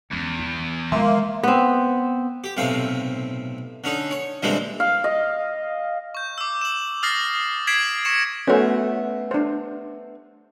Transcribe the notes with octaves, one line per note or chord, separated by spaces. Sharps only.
E2 B3 C#4
E3
E3 G#3 A#3 E5 C6
B3 C4
G4
B1 A2 C3 C4 F5
D3 C#4 D#4
C#5
A#2 D3 E3 G3 G#3 C4
F5
D#5
C#6 G6
D6 E6
E7 F#7
D#6 F6 A6 A#6 C7 F#7
G#6 B6 C7 D7 E7 F#7
C#6 A#6 C#7 E7
A3 B3 C#4 F#4 C5
D4 C5